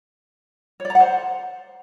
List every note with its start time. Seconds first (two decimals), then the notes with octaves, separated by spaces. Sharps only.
0.80 C#5
0.85 D5
0.90 A#5
0.95 F#5
1.00 C5